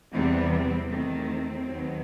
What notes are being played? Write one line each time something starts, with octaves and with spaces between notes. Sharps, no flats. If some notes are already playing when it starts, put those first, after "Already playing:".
E2 C3 E3 G3 B3 C4
C4
E2 D#3 A3 C4
D#2 D#3 F#3 B3